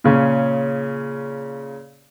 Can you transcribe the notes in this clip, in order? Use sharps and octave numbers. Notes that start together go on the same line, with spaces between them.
A#2 C#3 C#4